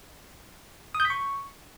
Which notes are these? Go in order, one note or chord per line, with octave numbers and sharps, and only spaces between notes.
D#6
G6
B6
C#6